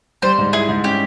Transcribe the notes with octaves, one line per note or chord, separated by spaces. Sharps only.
G3 C5
G#2
E4 G#4
G#2
C#4 G4